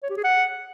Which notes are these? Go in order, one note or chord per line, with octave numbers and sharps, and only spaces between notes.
C#5
G4
G#4
F#5